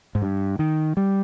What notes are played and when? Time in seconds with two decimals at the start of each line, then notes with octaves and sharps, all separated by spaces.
0.15 G#2
0.22 G2
0.59 D#3
0.97 G3